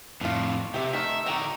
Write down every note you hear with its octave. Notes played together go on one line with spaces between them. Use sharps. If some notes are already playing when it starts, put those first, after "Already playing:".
F2 A2 D4 F4
C3 G4 E5
D#3 A3 E5
D3 D#4 F#4 G5 A#5